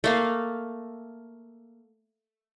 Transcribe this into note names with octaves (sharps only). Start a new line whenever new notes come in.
A3 A#3 F5